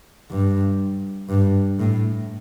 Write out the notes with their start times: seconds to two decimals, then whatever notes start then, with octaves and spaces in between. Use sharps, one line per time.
0.30 G2
1.29 G2
1.79 A2